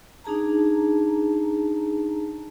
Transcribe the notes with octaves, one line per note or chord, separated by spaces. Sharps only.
D4 D#4 G#4 A5 A#5